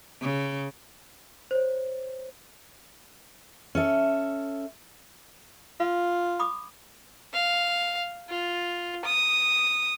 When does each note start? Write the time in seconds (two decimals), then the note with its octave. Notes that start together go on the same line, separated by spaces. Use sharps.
0.21 C#3
1.51 C5 C#5
3.75 C#4 A4 E5
5.80 F4 F5
6.39 B5 D6 D#6
7.33 F5
8.29 F4
9.04 D#6